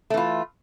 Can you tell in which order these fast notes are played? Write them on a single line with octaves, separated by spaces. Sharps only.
A3 E3 F4